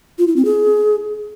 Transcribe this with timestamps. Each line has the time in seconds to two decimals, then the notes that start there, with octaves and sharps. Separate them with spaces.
0.19 F4
0.27 E4
0.36 C4
0.45 G#4